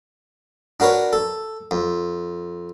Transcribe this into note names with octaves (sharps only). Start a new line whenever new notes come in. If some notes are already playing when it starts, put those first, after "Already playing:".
D4 F#4 A#4 B4 C#5
A4
F2